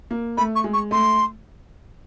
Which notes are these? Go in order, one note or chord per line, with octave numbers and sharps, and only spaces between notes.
A#3
A3 B5
C#6
G#3
C#6
A3 C6